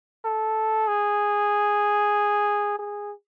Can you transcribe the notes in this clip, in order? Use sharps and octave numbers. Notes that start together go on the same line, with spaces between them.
A4
G#4
G#4